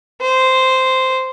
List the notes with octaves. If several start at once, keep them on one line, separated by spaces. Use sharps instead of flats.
C5